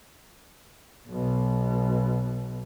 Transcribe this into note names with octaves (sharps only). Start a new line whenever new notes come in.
B1 B2